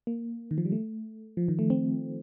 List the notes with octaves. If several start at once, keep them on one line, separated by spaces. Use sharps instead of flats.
A#3
D#3
F3
G3
A3
F3
D#3
A3
C4